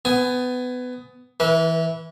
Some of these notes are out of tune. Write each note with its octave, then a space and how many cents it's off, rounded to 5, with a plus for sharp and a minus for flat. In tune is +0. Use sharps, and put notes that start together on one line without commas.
B3 +20 G#5 +0
E3 -10 B4 -35